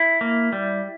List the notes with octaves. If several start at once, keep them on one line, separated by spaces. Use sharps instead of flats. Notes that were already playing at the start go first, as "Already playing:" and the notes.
Already playing: E4
A#3
G3